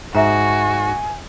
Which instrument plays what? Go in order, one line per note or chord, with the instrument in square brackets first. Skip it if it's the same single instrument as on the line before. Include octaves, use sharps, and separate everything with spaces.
[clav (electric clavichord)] G#2 [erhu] F#4 [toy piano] E5 A#5 [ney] G#5